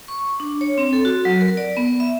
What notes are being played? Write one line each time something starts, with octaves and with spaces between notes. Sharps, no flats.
C#6
D4
C#5
C4
A4
F#4
F#3
A#4
D5
B3
E5